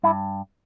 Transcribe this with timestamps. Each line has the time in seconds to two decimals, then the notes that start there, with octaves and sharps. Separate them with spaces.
0.03 G2 E4